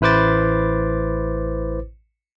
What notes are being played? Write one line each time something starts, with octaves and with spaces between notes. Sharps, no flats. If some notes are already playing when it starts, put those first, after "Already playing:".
A1 E4 B4 C5 D6 A6